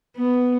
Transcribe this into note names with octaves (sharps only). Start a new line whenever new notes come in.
B3